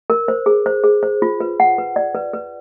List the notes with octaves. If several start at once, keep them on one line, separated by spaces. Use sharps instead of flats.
A#4
C5
G#4
C5
G#4
C5
F4
B4
F#5
B4
D5
B4
B4